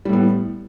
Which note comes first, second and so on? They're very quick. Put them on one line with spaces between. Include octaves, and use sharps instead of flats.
G3 A2 B3